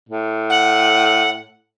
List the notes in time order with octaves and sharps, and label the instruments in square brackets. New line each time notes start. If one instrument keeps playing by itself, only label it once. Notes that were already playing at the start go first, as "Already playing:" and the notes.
[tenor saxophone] A2
[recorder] F#5